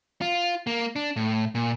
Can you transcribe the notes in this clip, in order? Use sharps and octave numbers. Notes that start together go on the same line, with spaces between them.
F4
A#3
D4
A2
A#2